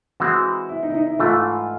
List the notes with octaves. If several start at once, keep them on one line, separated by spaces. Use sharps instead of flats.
E3 G#3 C4 F#4
E4
D#4
E4
D#4
E4
G#2 E3 A3 F4